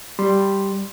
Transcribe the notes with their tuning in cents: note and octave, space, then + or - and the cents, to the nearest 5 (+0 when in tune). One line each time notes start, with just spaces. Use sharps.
G3 +0 C6 +0